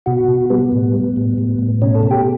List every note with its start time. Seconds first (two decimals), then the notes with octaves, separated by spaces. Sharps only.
0.06 B2 F#4
0.28 B2
0.50 G3 B3
0.72 A2
0.93 G3
1.16 A2
1.38 A2
1.59 A2
1.82 B2 C#4
1.95 A4
2.03 B2
2.11 G4